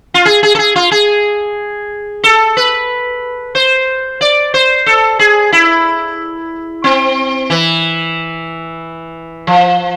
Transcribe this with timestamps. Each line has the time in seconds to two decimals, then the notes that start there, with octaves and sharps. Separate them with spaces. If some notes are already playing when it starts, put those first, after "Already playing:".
0.14 F4
0.25 G#4
0.43 G#4
0.55 A4
0.59 G#4
0.76 F4
0.91 G#4
2.24 A4
2.57 B4
3.55 C5
4.21 D5
4.54 C5
4.86 A4
5.19 G#4
5.52 E4
6.84 C4
7.50 E3
9.47 F3